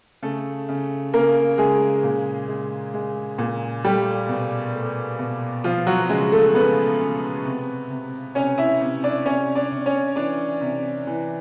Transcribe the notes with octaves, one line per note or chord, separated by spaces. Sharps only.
C#3 A3 A4
C#3
C#3 A#3 A#4
C#3 G#3 G#4
A#2
G#3
G#3
A#2
G3 A3 G4
B2
A3
B2
F3 F4
F#3 F#4
C#3 G#3 G#4
A3 A4
C#3 B3 B4
C#3
C3
C3
C3 C#4 C#5
E4 E5
C3
D4 D5
C3 C#4 C#5
D4 D5
C3
C#4 C#5
E3 D4 D5
C3
E3